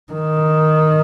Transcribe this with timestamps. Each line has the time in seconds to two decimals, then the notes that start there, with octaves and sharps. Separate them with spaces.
0.13 D#3